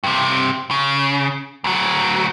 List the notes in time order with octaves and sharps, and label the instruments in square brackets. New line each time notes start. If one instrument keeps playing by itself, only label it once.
[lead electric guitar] G2 C3
C#3
D2 F#3